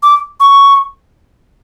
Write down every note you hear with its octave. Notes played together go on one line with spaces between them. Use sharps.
D6
C#6